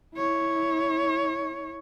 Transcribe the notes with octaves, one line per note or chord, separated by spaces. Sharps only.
E4 C#5